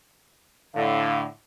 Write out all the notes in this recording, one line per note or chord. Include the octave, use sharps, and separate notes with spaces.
A2 D3 F5